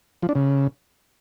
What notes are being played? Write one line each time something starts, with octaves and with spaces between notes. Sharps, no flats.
F3
D4
C#3